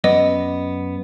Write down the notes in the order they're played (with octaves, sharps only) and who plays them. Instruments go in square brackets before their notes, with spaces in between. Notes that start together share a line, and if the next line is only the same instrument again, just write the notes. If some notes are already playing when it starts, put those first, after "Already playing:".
[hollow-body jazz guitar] F#2 B3 D5 [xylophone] D#5